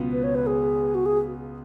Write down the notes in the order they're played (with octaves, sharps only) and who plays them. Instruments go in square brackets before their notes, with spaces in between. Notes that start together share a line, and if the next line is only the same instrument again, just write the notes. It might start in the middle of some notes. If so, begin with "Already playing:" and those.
Already playing: [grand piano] C#2 B2 F#3 B3 F4
[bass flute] B4
C#5
B4
G#4
F#4
G#4